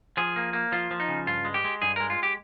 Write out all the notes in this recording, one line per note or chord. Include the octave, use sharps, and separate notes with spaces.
F3 G#4
A#3
A#3
F3 F4
F3
D#4
C#3
G2 F4
G#3
G4
G#3
G2 G#4
G#3 A#4
F4
G4